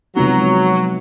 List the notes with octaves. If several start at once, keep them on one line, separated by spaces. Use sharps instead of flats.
C3 F3 F#3 G#3 B3 D#4